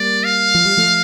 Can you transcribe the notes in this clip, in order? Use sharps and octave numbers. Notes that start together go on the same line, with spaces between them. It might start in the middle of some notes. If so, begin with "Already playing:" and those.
Already playing: G3 A#3 D5
F5
F3
G3
F3 A3